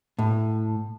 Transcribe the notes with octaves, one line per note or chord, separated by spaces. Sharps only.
A2